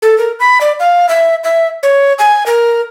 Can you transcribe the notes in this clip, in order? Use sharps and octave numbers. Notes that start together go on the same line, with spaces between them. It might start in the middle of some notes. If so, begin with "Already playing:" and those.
A4
A#4
B5
D5
F5
E5
E5
C#5
G#5
A#4